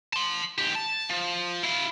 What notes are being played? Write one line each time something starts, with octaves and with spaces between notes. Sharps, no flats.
A5 C6
G#2 G4
A5
F3
E4 F5